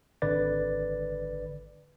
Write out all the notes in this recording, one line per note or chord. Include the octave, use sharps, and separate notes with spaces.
G#1 D3 B4 D5 A6